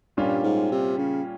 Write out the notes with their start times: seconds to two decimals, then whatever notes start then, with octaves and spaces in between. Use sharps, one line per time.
0.17 G2 A#2 G3 C#4 F4
0.44 G#2
0.72 C3
0.98 C#3